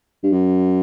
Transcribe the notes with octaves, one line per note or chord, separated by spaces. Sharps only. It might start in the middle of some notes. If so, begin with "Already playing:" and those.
G2
F#2